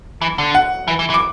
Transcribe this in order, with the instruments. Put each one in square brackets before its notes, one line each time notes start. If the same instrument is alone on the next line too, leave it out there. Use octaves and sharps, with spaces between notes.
[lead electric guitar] E3
D3
[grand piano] F#5
[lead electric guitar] E3
E3
E3
[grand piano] D6